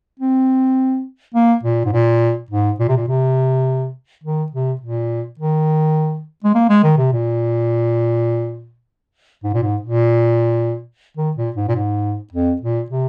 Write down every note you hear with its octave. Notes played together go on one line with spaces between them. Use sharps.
C4
A#3
A#2
G#2
A#2
G#2
A#2
C3
A#2
C3
D#3
C3
A#2
D#3
G#3
A#3
G#3
D#3
C3
A#2
G#2
A#2
G#2
A#2
D#3
A#2
G#2
A#2
G#2
F2
A#2
C3